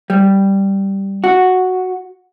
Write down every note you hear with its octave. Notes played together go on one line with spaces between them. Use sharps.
G3
F#4